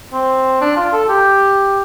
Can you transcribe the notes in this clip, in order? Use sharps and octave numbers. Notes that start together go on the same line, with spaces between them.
C4
D4
F4
A4
G4